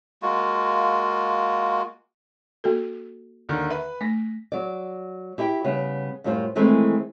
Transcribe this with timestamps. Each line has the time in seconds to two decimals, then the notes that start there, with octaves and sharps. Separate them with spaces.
0.22 G#3 A#3 F4 F#4
2.64 A#3 F#4 A4
3.49 D#2 D3 D#3
3.70 B4 E5 B5
4.01 A3 A#6 B6
4.52 F#3 D5
5.38 E4 G4 E5 G5
5.64 C#3 G3 B3
6.24 F#2 A2 G3 F4 A4 C5
6.55 D#3 E3 G#3 A3 C4 E4